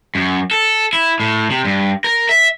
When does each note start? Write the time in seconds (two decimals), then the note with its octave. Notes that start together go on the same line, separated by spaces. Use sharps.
0.15 F#2
0.51 A4
0.93 E4
1.20 A2
1.50 C3
1.65 G2
2.04 A#4
2.29 E5